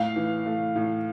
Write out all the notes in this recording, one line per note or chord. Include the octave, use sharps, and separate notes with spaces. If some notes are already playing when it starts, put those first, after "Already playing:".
Already playing: A2 F5
E3
A3
A2